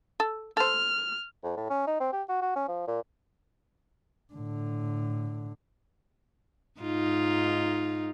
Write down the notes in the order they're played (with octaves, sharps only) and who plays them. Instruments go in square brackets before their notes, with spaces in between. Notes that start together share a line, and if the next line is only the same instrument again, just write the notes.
[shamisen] A4
[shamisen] A4 C5 [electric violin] F6
[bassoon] F2
A2
C#4
D#4
C4
G4
F#4
F#4
C#4
F3
A#2
[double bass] A2 D3
[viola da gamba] G#2 D#4 F4